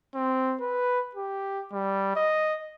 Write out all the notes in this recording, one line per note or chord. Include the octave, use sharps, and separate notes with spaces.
C4
B4
G4
G3
D#5